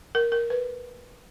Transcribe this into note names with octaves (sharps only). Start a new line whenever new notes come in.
A#4
A#4
B4